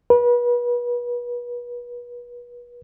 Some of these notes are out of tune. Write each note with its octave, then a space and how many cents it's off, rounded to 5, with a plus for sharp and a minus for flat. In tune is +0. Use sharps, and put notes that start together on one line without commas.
B4 -35